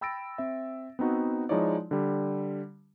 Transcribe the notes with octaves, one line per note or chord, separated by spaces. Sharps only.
G5 B5 E6 A6 A#6 D7
C4 E5
B3 C4 D#4 F#4
F3 G#3 D#4 E4 C#5 D5
D3 G3